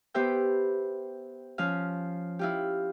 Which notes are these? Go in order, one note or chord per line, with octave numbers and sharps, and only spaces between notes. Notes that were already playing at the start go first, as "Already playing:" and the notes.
B3 G4 B4 C5 E5 G5
F3 C#4 F5
E4 F4 G4